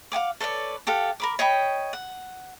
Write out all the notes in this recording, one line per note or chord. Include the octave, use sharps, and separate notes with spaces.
F5 F#5 G#5 D6
A4 B4 C#5 D5
G4 A4 F5 F#5
A#4 B5 D6
C#5 D#5 G5 B5
F#5